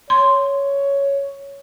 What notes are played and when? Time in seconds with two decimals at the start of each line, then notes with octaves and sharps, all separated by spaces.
0.10 C#5 C6